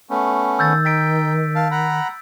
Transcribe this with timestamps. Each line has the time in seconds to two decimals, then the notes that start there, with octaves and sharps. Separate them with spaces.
0.10 A3 B3 C#4
0.59 D#3 E6 G6 A6
0.85 D#4 G5 A6 B6 D7
1.55 F5 A5
1.71 F#5 A#5 B5